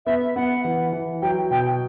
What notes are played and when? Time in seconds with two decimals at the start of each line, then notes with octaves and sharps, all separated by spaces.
0.06 B3 E5
0.36 B3 F#5
0.64 E3
0.93 E3
1.22 F#3 G5
1.51 B2 G5